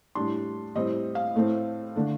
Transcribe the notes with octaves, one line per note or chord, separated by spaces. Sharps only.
A2 G3 D4 C6
A2 G3 C4 D#5
F5
A2 A3 C4
D3 A3 D4